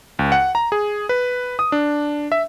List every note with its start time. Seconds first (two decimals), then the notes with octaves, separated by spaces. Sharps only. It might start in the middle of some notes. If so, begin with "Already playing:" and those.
0.19 C#2
0.32 F#5
0.55 A#5
0.72 G#4
1.09 B4
1.59 D#6
1.72 D4
2.32 E5